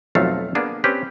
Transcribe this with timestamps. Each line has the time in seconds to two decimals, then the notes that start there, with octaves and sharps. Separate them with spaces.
0.15 B1 F2 F#3 A3 A4 F5
0.55 A#3 B3 D4 G#4
0.84 C4 C#4 G4 B4